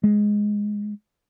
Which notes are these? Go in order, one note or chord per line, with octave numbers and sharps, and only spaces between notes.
G#3